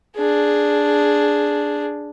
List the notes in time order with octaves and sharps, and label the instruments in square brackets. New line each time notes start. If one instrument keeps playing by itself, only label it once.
[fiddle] D4 G#4